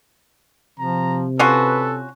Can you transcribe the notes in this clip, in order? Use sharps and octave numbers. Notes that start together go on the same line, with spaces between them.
C3 F3 A#5
C#4 F4 F#4 A4 B4